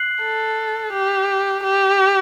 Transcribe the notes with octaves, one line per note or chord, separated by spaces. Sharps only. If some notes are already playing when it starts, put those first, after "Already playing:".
Already playing: F#6 C7 F#7
A4
G4
G4